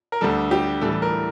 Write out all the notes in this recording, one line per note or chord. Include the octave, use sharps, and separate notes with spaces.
A#4
D2 D3 G3 A4
G4
A2 E3 G3 A4
A4
A#4